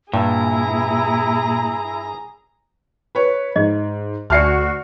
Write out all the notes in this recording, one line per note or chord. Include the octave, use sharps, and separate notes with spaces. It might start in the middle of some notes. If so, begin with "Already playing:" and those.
G2 A#2 E4 G#4 A#5
B4 C#5
G#2 D#5
D2 F#4 D5 E5 A5 F6 C7 C#7